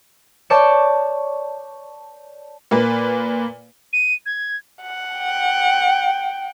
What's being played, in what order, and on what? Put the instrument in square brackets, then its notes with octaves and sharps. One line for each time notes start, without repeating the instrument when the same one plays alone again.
[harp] C#5 D5 A5 G6 C#7 E7
[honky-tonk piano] A#2 A#3 B4
[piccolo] D#7
G#6
[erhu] F#5
[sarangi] G5